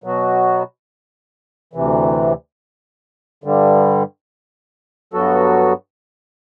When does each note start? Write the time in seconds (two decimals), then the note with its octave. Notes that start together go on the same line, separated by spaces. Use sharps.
0.04 B2 F#3 B3 F#4
1.73 D2 C3 E3
3.44 G2 D3 G3
5.13 G2 F#3 B3 F#4 A4